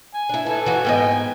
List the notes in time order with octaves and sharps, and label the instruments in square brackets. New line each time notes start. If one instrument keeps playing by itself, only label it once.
[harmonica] G#5
[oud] D4 E4
[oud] E4 [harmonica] A4 B4 G#5
[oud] E3 F#4
[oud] G#2 B3 D#5 [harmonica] G5 G#5